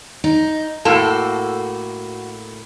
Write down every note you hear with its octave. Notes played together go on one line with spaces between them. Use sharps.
D#4
A2 A#3 F#4 A4